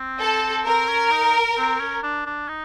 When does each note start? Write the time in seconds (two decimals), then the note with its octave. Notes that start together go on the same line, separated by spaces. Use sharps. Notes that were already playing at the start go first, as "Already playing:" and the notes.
Already playing: C4
0.21 A4
0.66 C4 A#4
0.89 C#4
1.11 D#4
1.57 C4
1.80 C#4
2.03 D4
2.26 D4
2.48 D#4